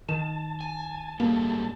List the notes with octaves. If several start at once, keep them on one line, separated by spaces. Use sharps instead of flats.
D#3 A5
G#5
G#2 G3 A3 A#3